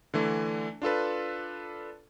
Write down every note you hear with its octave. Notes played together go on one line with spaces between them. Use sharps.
D3 E3 A3
D4 F4 A4 B4